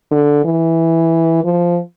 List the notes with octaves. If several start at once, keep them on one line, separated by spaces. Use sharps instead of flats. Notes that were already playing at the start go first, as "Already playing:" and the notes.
D3
E3
F3